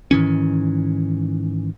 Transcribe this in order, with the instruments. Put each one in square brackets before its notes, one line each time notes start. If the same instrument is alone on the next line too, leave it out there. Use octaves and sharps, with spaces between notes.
[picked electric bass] G#2 D#3 E3 C#4